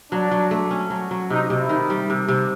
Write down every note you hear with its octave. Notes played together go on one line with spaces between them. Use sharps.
F#3 D4
F#3
A3
C#4
F#3
F#3
C3 D#4
C3
E4
D#3
G3
C3
C3